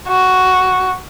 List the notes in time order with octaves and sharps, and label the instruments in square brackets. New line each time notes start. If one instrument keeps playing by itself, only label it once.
[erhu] F#4